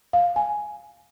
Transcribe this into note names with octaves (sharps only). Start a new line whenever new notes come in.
F5
G#5